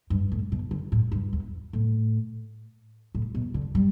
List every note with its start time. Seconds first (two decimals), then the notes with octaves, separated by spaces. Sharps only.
0.10 G2
0.32 A2
0.52 B2
0.71 D3
0.92 A2
1.12 G2
1.33 E2
1.73 A2
3.15 A2
3.35 B2
3.54 D3
3.75 G3